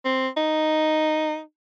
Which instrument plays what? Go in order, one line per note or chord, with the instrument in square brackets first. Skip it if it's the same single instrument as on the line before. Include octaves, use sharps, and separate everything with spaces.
[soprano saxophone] C4
D#4